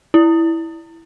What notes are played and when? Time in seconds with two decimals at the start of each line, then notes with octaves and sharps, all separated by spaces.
0.14 E4